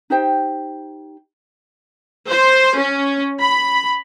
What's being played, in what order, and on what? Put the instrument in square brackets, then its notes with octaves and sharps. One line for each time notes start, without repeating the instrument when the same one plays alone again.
[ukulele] D#4 G4 C5 G5
[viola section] C5
C#4
B5